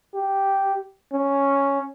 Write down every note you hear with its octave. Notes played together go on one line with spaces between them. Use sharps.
G4
C#4